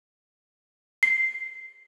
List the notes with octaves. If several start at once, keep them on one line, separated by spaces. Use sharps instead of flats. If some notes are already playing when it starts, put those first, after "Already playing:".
C7